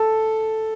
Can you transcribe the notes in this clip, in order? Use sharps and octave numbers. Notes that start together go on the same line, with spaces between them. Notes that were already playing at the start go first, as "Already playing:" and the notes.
Already playing: A4